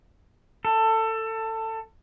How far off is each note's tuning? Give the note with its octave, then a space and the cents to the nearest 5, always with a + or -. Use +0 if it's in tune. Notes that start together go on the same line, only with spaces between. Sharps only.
A4 +20